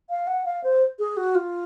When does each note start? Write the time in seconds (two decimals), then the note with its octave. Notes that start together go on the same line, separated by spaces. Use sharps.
0.10 F5
0.27 F#5
0.45 F5
0.64 C5
0.99 G#4
1.17 F#4
1.35 F4